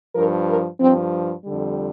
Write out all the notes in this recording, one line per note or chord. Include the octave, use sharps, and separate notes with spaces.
G2 F3 A#4
A#4
G2 F3 C4
F2 D3 G3